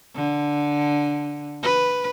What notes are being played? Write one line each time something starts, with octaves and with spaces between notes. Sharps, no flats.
D3
B4